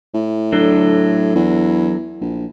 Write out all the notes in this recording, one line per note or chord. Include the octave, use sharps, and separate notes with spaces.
A2
F#3 D4 A4
E2
A#1